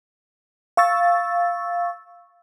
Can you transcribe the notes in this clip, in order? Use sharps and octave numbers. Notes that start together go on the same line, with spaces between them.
F5 C#6 E6 A6